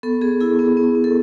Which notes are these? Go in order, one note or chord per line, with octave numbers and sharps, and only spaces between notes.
B3 A4
B3 G#4
E4 G#4
B3
B3
B3
A4